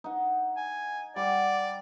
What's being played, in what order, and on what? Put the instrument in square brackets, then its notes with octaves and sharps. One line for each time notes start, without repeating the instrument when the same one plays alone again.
[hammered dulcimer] D#4 F#5
[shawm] G#5
[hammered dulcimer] G3 F#5 [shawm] D5